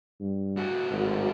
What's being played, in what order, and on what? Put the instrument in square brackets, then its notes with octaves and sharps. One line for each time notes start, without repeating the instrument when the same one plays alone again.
[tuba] G2
[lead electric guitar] A2 F#4
[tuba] G#1